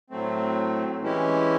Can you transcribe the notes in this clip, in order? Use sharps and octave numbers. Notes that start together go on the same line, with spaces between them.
A2 F#3 A3 C4
E3 G#3 C#4 E4 G4